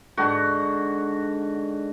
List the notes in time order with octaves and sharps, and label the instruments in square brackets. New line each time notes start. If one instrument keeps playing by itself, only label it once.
[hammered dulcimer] G#2 D3 F#4